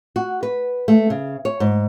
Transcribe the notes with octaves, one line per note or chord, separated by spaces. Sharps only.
F#4
B4
A3
C#3
C#5
G#2